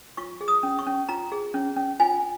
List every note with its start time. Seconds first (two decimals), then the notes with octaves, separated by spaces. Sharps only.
0.17 F4 C#6
0.41 G#4
0.48 D#6
0.63 C#4
0.79 C#6
0.86 C#4
1.09 F4 A#5
1.32 G#4
1.54 C#4
1.77 C#4
2.00 F4 G#5